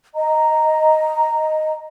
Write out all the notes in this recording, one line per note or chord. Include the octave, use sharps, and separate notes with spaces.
D#5 A#5